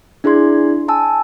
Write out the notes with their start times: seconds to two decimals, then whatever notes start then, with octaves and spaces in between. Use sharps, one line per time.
0.24 D4 E4 G#4 D5 C6 G#6
0.88 G#5 A5 E6